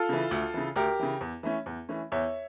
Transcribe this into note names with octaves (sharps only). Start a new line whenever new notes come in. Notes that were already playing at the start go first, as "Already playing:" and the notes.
Already playing: F4 A4
C#3 E3
D2
C#3 E3
D2 G4 A#4
C#3 E3
E2
E3 A3 C#4
E2
E3 A3 C#4
E2 C#5 E5